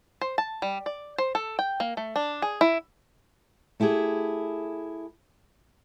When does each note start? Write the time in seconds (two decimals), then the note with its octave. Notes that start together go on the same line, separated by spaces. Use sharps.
0.21 C5
0.38 A5
0.62 G3
0.86 D5
1.18 C5
1.35 A4
1.59 G5
1.80 A#3
1.97 A3
2.16 D4
2.42 G#4
2.61 E4
3.80 A3 E4 G4 G#4